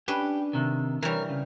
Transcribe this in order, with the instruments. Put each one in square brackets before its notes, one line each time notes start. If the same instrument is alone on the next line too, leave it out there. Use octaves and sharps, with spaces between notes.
[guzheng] C#4 D4 B4 [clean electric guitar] G4
[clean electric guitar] C3 D#3
[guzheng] E3 G3 [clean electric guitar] A#4 C#5
[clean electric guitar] C#3